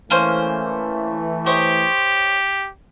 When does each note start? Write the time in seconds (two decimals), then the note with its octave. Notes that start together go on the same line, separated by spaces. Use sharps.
0.10 E3 A3 A#3 C#4 C5
1.46 G4 C5 C#5 D#5